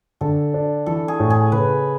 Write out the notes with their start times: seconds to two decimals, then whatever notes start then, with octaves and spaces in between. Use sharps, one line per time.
0.21 D3 A4
0.54 D4
0.86 E3 A4
1.08 G#4
1.20 A2
1.30 G#4
1.52 C#3 B4